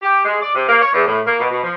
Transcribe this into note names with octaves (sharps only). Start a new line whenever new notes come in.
G4
G#3
D5
C3
A#3
C#5
E2
A2
A#3
B2
B2
F3